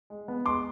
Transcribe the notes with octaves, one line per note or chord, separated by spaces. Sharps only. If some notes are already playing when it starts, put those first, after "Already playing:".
G#3
B3
G#3 C6 D6